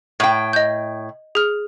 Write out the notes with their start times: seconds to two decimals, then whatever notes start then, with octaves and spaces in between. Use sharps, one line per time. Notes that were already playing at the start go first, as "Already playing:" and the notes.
0.20 A2 G5
0.53 D#5 G6
1.35 G#4 F6